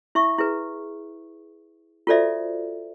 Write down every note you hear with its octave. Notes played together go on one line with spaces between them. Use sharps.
E4 E5 C#6
E4 G#4 B4
F4 F#4 A4 C5 D5 E5